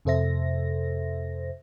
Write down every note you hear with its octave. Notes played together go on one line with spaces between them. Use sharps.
F2 C3 A4 C5 E5 A#6